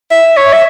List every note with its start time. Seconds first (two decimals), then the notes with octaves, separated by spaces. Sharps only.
0.11 E5
0.37 C#5
0.53 E5